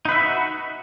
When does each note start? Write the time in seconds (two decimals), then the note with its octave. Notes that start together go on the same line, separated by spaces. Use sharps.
0.05 D#4
0.09 B4
0.12 E5
0.15 F#4